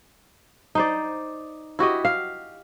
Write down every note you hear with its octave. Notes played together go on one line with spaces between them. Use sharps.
D#4 C5 D5
E4 F#4 G4 D#5
F5